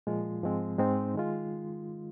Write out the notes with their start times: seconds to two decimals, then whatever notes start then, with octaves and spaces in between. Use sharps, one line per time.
0.07 A#2 F3 G#3 F4
0.43 G#2 F3 G#3 C4
0.78 G#2 G#3 C4 D#4
1.14 D#3 G#3 F4